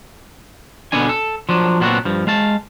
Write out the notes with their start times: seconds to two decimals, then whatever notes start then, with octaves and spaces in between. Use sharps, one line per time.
0.92 B2 D3 B3 C4 D4 G#5
1.09 A4
1.49 F3 F#3 D4
1.80 A#2 F#3 B3 C4 D4 F#4
2.05 G2 F3
2.27 G#3 F5 A5